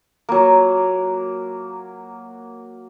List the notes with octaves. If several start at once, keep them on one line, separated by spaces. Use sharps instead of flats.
F#3 A#3